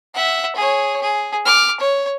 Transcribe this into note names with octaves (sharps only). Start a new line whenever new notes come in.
E5 F#5
G#4 C#5
G#4
D6 F6
C#5